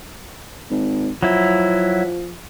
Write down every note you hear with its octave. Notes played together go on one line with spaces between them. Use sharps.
G#1
F3 F#3 E4